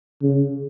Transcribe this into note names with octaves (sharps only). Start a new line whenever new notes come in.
C#3